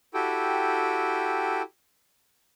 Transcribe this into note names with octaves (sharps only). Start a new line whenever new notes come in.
E4 F#4 G4 A4 G5